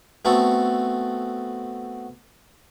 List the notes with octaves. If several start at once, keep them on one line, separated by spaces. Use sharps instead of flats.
A3 B3 C4 F#4 A4